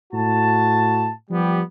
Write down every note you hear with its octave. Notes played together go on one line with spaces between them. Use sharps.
A2 F#4 A5
F3 G3 B3 G4